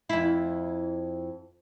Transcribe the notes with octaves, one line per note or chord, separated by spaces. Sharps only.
F2 E4